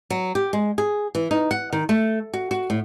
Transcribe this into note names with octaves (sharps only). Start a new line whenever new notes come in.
F#3
G4
G#3
G#4
E3
D#4
F#5
D#3
A3
F#4
F#4
A2